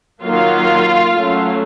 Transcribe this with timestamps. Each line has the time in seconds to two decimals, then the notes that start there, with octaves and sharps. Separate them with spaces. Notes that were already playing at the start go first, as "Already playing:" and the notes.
0.24 D#3 F#3 A#3 F4 F5
1.15 F#3 A3 C#4